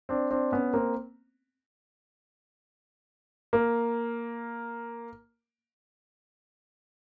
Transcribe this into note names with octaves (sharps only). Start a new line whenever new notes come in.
C4 D4
C4 D4
B3 C#4
A#3 C4
A#3